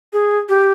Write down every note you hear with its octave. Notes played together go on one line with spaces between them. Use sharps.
G#4
G4